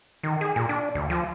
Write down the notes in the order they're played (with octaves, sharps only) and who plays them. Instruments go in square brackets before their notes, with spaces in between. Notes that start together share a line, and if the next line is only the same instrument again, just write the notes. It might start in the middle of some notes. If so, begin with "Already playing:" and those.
[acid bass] D#3
G#4
A#2
D4
D2
F3